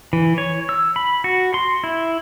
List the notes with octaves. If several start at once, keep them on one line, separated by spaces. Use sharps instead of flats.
E3
C#5
E6
B5
F#4
C6
E4